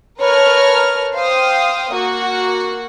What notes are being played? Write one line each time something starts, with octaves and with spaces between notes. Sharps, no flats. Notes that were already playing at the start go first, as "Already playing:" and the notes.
A#4 B4 C#5 A5 A#5 F6
C5 F5 G5 D#6
A#3 F#4 F#5